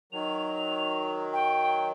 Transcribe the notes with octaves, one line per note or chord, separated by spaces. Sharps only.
D#3 F#3 F7
G5